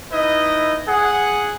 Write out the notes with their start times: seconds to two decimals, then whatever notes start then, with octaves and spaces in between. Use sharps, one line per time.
0.12 D#4 E4 B4 D#5
0.88 G#4 F#5